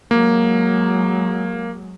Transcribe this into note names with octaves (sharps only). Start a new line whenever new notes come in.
F#3 G#3 A#3